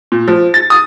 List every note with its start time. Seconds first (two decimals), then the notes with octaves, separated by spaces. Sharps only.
0.12 A#2
0.28 F3
0.54 A6
0.70 D#6